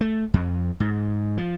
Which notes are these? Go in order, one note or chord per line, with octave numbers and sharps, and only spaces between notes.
A3
F2
G#2
F3